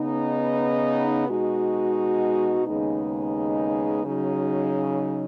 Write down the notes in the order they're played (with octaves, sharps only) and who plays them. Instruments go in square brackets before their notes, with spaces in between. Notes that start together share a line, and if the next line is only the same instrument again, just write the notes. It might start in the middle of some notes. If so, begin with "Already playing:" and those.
Already playing: [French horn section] C#3 B3 D#4
B2 G#3 D#4 F#4
D#2 C#3 G#3 B3 D#4
C#3 F#3 D#4